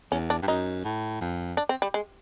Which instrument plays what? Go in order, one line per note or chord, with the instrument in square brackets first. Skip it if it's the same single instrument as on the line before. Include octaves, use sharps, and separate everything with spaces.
[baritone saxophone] E2 [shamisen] C#4
[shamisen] D4
[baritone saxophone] G2
[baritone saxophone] F#2 [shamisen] D#4
[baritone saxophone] A2
F2
[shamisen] D4
C4
G3
G#3